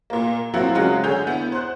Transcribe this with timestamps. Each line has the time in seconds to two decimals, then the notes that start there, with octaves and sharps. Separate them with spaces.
0.10 A#2 A#3
0.54 F3 F#3 A#3 C4 E4 F#4
0.75 C#3 F#3 G#3 F4 F#4
1.04 D3 G#4 C#5 G6 F7
1.27 B3 E4
1.52 C5 F#6